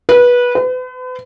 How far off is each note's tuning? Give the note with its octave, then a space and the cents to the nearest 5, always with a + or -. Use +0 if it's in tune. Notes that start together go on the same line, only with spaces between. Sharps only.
B4 -20
B4 +40